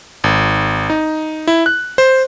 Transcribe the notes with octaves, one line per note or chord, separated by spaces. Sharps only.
G#1
D#4
E4
F#6
C5